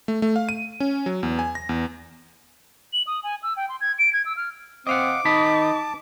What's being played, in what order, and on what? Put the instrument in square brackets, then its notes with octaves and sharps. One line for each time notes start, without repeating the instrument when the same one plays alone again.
[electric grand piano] A3
A3
F5
D#7
C#4
F#3
E2
G#5
A#6
E2
[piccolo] F#7
D#6
G#5
E6
G5
C6
G#6
D7
G#6
E6
F6
[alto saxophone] C4 [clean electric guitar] D#5 F5 F#5 [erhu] D6
[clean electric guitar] D#3 D#5 B5 [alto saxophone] D#4 [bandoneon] A5